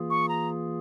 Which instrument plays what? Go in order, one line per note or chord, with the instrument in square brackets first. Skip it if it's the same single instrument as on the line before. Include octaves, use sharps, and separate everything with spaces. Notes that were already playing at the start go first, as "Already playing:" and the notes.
Already playing: [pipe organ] E3 A#3 F4 G#4
[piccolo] C#6
A#5